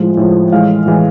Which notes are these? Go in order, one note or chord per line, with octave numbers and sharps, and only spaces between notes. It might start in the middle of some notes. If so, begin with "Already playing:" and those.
Already playing: A2 F3 G#3
A2 F3 G#3
A2 E3 G#3 F5
A2 E3 G#3